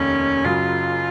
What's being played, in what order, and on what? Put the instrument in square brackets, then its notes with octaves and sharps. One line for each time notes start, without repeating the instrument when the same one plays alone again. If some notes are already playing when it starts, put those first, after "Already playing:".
Already playing: [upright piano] F1 D#2 D#3 [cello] C#4
[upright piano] F#1 F#2 C#3 F#3 [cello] F4